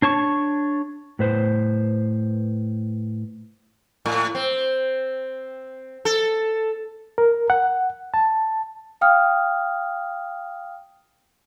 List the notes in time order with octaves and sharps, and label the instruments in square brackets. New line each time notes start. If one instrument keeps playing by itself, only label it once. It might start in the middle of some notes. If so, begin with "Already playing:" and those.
[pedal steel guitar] D4 C#5 A5 C#6
[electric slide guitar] A2 B4 C5
[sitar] A2
C4
A4
[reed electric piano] A#4
F#5
A5
[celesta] F5 G5 D#6 F6